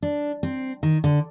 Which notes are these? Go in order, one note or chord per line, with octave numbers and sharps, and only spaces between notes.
D4
C4
D#3
D3